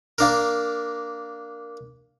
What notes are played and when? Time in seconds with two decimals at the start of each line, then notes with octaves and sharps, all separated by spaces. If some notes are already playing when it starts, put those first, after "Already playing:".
0.18 A#3 D4 A#4